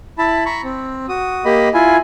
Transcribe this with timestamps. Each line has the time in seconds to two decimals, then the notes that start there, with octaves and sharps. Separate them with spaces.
0.18 E4 A5 B5
0.46 A#5 B5 C#6
0.64 C4
1.09 F#4 D#6
1.45 A#3 G4 D#5 B5
1.74 E4 F4 G#5